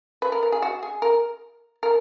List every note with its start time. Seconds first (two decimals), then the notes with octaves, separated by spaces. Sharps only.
0.22 B4
0.32 A#4
0.43 A#4
0.52 G#4
0.62 F#4
0.83 G#4
1.02 A#4
1.83 A#4